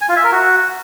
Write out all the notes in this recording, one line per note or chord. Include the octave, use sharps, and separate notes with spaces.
G#5
F4
E5
A#4
F#4